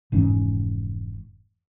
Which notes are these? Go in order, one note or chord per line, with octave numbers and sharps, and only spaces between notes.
F1 G#2 E3 C#4